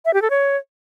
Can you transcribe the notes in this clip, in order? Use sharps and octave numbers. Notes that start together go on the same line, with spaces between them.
E5
G4
A4
C#5